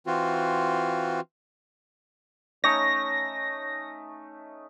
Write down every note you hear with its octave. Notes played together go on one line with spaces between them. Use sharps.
E3 C4 F4 F#4
A3 C#4 D#4 C#5 A#6